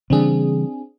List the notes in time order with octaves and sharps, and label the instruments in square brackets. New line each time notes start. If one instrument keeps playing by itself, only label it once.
[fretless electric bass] C#3 E3 G3 [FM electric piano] C4 D4 G#4